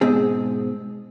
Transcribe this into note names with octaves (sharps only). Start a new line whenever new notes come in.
G#2 B2 C4 G#4